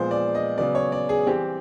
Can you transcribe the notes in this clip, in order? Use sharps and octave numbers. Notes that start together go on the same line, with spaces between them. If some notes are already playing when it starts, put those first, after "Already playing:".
Already playing: A#2 F3 G#3 B3 C5
D5
D#5
C#3 F#3 B3 D5
C#5
D5
G#4
E3 G3 C4 G4